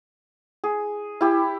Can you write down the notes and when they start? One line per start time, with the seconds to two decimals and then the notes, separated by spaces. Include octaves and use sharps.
0.64 G#4
1.21 E4 G4